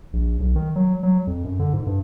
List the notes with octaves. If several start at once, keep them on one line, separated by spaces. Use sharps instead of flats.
A#1
B1
D#3
F#3
F#3
F2
F#2
D3
G#2
G2